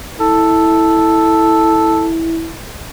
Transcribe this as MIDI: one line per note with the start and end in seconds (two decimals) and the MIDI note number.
0.20 2.53 64
0.20 2.08 69